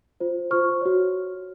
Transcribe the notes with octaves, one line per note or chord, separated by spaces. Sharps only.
F4 C5
F4 C5 C#6 F6
F#4 C#5